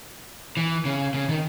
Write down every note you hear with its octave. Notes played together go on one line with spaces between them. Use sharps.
E3
C#3
C#3
D#3